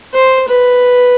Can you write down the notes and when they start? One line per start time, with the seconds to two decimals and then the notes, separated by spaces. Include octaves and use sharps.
0.14 C5
0.48 B4